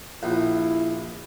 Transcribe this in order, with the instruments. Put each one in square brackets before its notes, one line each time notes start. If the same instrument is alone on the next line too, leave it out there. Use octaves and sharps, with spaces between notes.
[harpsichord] A#1 [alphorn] E4